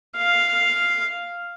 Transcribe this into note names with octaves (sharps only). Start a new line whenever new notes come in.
F5